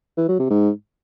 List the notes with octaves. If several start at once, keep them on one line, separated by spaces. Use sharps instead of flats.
E3
F#3
C3
G#2